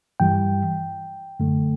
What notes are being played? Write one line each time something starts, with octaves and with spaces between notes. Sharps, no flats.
G2 E3 G3 G5
F#2 D3 A3